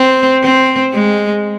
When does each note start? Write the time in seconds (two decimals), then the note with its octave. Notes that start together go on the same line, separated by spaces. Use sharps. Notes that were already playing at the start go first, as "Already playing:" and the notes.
Already playing: C4
0.43 C4
0.94 G#3